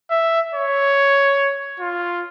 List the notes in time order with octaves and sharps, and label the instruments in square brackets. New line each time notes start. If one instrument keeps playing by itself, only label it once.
[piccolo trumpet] E5
C#5
F4